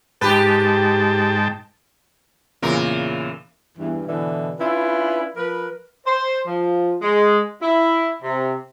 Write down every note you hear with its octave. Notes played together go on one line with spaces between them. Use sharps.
G#2 G4 B4 G5 A5
E2 A#2 C#3 E3 A#4
E2 G2 E3
B2 D3 E3
C#4 D4 E4 F4 B4
F3 A#4 B4
C5
F3
G#3
E4
C3